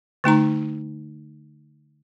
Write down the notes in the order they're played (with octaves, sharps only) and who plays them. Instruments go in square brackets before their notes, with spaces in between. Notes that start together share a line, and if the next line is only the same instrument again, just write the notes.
[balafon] D3 A3 D#4 A#5